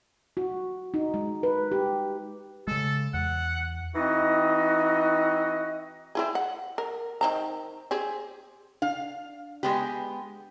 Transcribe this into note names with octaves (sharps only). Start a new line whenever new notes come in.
F#4
D#4
G#3
B4
G4
C#3 G#3 A4
E2 F#5
E3 C4 D#4 F#4 D#5
C4 E4 G#4
F#5
A#4
D#3 C4 A#5
C4 G4 G#4
D4 F5
G#3 B3 G4